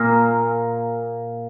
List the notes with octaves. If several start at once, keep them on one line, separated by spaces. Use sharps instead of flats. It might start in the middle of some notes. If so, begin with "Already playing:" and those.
Already playing: A#2 A#3